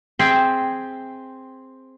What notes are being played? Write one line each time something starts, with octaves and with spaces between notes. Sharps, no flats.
C4 G#4 E5 G5